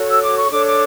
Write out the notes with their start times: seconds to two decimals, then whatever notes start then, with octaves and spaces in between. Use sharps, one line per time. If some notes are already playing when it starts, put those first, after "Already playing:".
Already playing: F#4 A4 C#5
0.09 E6
0.21 D6
0.36 C#6
0.49 D4 A4 C#5 D6
0.65 D6